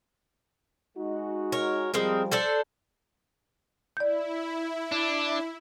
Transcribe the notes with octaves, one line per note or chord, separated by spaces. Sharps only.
G#3 D#4 F#4
A#4 C#5
F3 G3 G#3 C4 A#4
D4 A4 C5
E4 D5 G6
D4